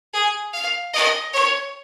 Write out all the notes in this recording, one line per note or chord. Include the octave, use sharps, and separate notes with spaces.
G#4
F5
D#5
C#5